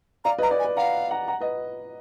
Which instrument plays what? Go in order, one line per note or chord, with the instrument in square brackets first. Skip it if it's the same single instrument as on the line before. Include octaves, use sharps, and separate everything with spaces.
[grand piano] D5 F5 [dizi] A#5
[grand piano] B4 D#5
[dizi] A#5
[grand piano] D5
[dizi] G#5
[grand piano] B4
[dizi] F5 [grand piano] F#5 A#5
[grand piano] F#5 A#5
F#5 A#5
B4 D#5